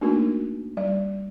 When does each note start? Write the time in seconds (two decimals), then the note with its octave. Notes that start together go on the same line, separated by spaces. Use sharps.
0.01 A3 A#3 D4 D#4 F#4 A#4
0.77 G3 D5